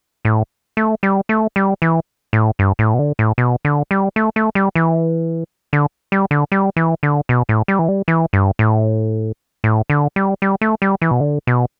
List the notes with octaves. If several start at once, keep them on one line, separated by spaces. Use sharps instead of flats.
A2
A3
G3
A3
G3
E3
A2
G2
A2
B2
D3
A2
B2
D3
G3
A3
A3
G3
E3
D3
G3
D3
G3
E3
D3
B2
A2
G3
E3
G3
E3
G2
A2
A2
D3
G3
G3
A3
G3
E3
B2
D3
B2